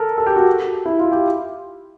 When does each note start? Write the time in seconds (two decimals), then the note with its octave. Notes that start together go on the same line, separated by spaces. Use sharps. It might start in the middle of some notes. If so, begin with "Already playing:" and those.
Already playing: A4 A#4
0.18 A4
0.26 G4
0.36 F#4
0.86 E4
0.99 F4
1.12 G4